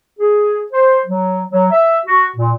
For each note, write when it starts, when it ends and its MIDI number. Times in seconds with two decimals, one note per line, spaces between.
0.19 0.62 68
0.72 1.00 72
1.07 1.41 54
1.50 1.66 54
1.71 1.98 76
2.06 2.27 66
2.37 2.52 46